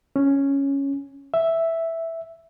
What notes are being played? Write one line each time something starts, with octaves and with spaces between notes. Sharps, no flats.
C#4
E5